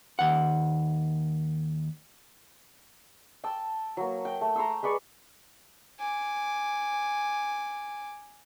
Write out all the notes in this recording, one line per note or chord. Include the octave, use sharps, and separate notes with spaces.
D#2 F#5
G5 A5 E6
F#3 A#3
G5
A3
A#5 C6 C#6 E6
G#3 B4 D5 C#6
G#5 D6